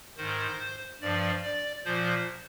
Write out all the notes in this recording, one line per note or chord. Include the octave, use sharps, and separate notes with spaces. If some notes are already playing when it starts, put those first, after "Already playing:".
G#2 D#3 C5
G2 F3 D5
D5
A#2 F3 C5